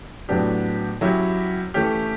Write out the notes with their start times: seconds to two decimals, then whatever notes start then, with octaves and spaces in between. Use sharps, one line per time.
0.29 A2 F#3 B3 D4 G4
1.01 F#3 C#4 E4 G4
1.74 E3 A3 C#4 G4